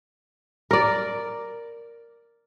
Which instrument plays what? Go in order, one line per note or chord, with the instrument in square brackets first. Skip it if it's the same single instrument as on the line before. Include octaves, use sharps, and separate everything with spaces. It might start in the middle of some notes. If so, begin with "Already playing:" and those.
[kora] A#4 D5